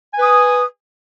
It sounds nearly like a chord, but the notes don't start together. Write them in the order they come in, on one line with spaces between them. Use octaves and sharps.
G#5 B4 D#6